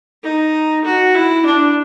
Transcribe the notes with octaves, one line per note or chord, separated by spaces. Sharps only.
D#4
F#4
E4
D4